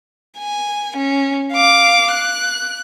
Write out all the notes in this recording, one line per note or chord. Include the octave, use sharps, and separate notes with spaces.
G#5
C#4
F5 D6
F#6